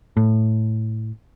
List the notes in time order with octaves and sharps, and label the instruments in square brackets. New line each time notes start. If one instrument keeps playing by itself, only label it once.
[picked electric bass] A2